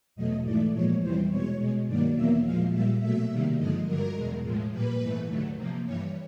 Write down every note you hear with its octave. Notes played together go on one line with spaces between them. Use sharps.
E2 B2 F#3 A3 D#5
G#2 E3 A3 D5
A#2 F3 G#3 C#5
E2 C3 E3 G3 C5
B2 G#3 C#5
B2 G#3
G2 D#3 F#3 A#3 D5
E2 B2 F#3 A#3 E5
A#2 F3 G#3 F5
A#2 G3 A#3 E5
B2 F#3 A3 E5
C3 D#3 G3 A#3
G2 D3 F3 G#3 D#5
G2 D3 F#3 A#4
E2 B2 G#3
A2 F3 G#3
A#2 G3 A#3 B4
G#2 E3 A3
D#2 D3 F#3 A3
C3 F3 A#3
G2 E3 G3 C#5